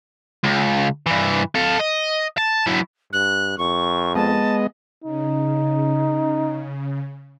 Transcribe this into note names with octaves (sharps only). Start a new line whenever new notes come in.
C#2
G2 E3
A4 F5
D#5
A5
F#3 E4
G2 F#6
F2 C#6
G#3 B3 D#5 A5
C#3 D#4